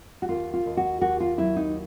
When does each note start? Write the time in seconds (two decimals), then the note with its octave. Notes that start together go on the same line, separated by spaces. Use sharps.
0.22 F#4
0.29 D#2 F4
0.54 F4
0.66 D#2
0.77 F#4
1.01 D#2 F#4
1.20 F4
1.38 F#3 E4
1.56 D#4